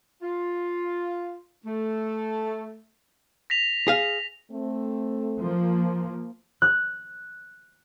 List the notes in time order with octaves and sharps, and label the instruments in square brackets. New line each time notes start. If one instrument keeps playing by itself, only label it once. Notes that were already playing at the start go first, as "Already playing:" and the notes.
[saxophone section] F4
A3
[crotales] A#6 B6 F7
[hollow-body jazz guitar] G#4 F5
[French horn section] A3 C4
[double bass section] F3 A#3
[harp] F#6